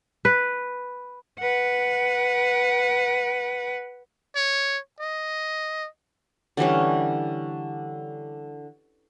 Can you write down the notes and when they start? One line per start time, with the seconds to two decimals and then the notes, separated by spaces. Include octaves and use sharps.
0.25 B4
1.40 B4 F#5
4.36 C#5
5.00 D#5
6.57 D3 E3 G3 C#4